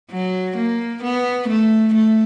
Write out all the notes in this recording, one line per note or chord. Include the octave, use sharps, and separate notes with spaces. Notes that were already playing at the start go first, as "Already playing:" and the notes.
F#3
A#3
B3
A3
A3